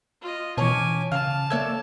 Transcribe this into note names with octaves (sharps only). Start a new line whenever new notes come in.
F4 D#5
B2 E3 C#4 C#5 G#5 A5 D6
C#3 F5 A5
A#3 A4 C#5 D5 E5 G#6